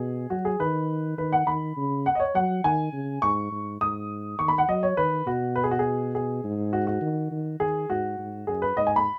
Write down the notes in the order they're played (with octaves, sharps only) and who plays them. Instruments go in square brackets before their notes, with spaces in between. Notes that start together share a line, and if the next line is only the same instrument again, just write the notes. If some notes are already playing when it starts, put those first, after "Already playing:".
Already playing: [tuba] B2 [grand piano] G#4
[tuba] F#3 [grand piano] F#4
[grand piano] G#4
[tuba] D#3 [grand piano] B4
[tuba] D#3 [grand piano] B4
[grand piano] F#5
[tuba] D#3 [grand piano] B5
[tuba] C#3
[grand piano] F#5
D#5
C#5
[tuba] F#3 [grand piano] F#5
[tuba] D#3 [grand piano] G#5
[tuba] C#3
[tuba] G#2 [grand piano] C#6
[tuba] G#2
[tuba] G#2 [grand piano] D#6
[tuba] D#3 [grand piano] C#6
[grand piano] B5
F#5
[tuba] F#3 [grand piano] D#5
[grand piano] C#5
[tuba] D#3 [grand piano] B4
[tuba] B2 [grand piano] F#4
[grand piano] B4
G#4
F#4
G#4
G#4
[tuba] G#2
[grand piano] F#4
F#4
[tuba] D#3
D#3
[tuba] D#3 [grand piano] G#4
[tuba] G#2 [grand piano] F#4
[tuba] G#2
[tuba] F#2 [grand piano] G#4
[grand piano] B4
[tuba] G#2 [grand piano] D#5
[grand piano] G#5
B5